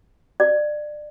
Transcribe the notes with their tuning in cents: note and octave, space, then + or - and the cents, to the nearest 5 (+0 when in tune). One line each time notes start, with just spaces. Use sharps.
D5 +25